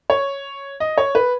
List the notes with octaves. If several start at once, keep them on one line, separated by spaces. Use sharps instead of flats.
C#5
D#5
C#5
B4